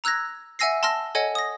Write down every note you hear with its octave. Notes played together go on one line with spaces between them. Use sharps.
A#5 E6 F#6 G#6 A#6
E5 F#5 G#5 E6 A#6 C7
A5 C6 E6 F6 A#6
A4 C#5 D#5 F#5 G#5
D#6 A#6